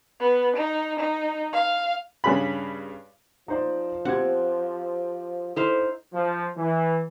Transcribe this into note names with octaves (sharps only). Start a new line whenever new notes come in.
B3
D#4
D#4
F5
G2 C#3 B5
F3 D#4 C5 D5
C4 G4 C5 F#5 G#6
D#4 E4 A4 C5 F5
F3
E3